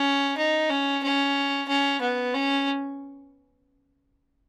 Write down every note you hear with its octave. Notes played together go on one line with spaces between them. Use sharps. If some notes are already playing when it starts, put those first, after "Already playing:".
Already playing: C#4
D#4
C#4
C#4
C#4
B3
C#4